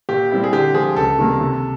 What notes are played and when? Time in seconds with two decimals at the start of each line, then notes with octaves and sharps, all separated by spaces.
0.09 A#2 G4
0.31 G3 C4 E4
0.44 G#4
0.52 D3 G4
0.74 F3 G#3 G#4
0.96 C#2 A4
1.19 C3 D#3 G3 A#3
1.41 C3